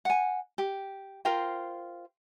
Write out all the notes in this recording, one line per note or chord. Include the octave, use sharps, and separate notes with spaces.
F#5 G#5
G4
F4 A#4 C5 G5